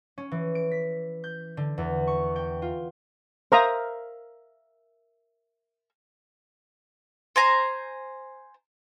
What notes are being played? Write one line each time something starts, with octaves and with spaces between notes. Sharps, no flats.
C#4
E3
D7
B6
G6
D3
E2
C#6
G5
F4
A#4 C5 E5 F5 A#5 D#6
C5 G#5 A#5